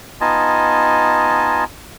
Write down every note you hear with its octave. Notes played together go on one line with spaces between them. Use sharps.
B3 D#4 F4 D#5 G#5 A5